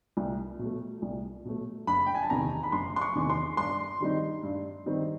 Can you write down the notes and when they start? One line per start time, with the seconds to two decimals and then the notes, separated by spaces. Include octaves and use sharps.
0.17 C2
0.59 B2 F#3 A3
1.02 C2
1.45 B2 F#3 A3
1.87 F#1 B5
2.06 G5
2.15 G#5
2.23 A5
2.30 E2 C3 D#3 A#5
2.63 B5
2.72 F#1 C6
2.96 C6
3.01 C#6
3.15 E2 C3 D#3
3.30 C6
3.57 G2 C6
4.00 D#3 G3 C4 D#4
4.43 G2
4.86 D#3 G3 C4 D#4